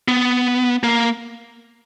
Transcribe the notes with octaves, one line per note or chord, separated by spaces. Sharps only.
B3
A#3